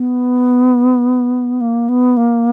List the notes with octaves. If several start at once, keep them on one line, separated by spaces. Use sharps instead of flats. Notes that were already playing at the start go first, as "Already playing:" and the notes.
Already playing: B3
A#3
B3
A#3